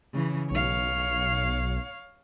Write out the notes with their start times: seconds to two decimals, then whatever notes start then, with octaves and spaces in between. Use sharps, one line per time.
0.13 C#3 E3
0.51 B1 C#5 F5